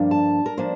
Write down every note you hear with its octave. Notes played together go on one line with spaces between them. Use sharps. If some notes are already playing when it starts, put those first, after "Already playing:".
Already playing: G2 F3 A#3 D4
A5
A#4
F3 A#3 D4 C5